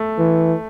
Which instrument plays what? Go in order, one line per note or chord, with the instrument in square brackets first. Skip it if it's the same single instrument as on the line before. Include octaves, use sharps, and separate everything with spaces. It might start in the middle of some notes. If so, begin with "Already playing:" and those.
Already playing: [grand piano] A3
[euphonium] E3